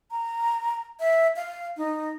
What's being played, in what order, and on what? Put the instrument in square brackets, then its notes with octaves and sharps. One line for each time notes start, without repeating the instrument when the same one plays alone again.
[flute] A#5
E5
F5
D#4